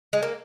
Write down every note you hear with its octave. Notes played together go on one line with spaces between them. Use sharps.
G#3
A#3